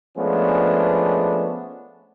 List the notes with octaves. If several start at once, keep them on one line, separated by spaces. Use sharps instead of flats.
F3 G#3 A3 B3 C#4 D4